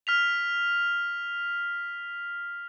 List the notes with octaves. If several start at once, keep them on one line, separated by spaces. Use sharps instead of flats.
F6 B6 F7